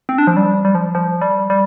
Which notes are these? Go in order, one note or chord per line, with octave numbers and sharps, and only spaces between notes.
C4
D4
F3
G3
G3
F3
F3
G3
G3